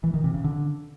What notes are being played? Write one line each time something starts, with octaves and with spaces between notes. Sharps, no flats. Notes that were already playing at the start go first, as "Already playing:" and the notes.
E3
D#3
C3
C#3
D3